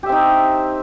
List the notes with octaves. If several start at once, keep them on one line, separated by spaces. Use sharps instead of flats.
C4 D#4 G4 E5